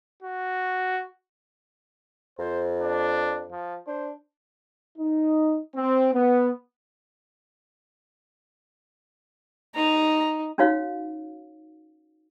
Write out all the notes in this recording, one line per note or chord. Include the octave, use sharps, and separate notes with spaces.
F#4
F2 C5
D4
F3
D4 C5
D#4
C4
B3
D#4 A#5
C#4 D#4 F#4 C#5 F5